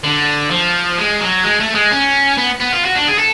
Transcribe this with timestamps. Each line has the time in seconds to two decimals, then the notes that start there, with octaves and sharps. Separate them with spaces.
0.04 D3
0.51 F3
0.98 G#3
1.20 F#3
1.43 G#3
1.60 A3
1.75 G#3
1.91 C#4
2.38 B3
2.60 B3
2.72 F4
2.84 F#4
2.95 D4
3.07 G#4
3.18 A4